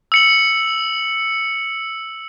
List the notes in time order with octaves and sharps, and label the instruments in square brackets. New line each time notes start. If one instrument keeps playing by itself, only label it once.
[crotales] E6 C#7 F#7